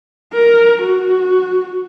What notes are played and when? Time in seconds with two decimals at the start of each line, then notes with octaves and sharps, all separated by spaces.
0.33 A#4
0.83 F#4